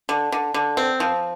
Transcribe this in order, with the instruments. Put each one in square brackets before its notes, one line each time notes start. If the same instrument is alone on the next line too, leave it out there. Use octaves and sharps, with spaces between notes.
[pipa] D3
D3
D3
C4
F3